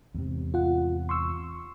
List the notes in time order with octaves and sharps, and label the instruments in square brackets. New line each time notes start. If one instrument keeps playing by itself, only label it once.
[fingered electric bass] E2 G#2 C3
[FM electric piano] F4 F#5
C6 C#6 E6